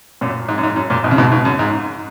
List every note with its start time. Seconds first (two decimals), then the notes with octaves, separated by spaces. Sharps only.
0.21 F#2 A#2
0.48 G#2
0.58 F#2
0.63 G#2
0.76 F#2
0.90 F#2 A#2
1.04 G#2 B2
1.11 C#3
1.18 G#2 B2
1.32 G#2
1.45 F#2
1.59 G#2